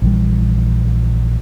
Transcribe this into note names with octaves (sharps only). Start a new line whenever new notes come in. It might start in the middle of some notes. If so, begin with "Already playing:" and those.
A#1 E3 G3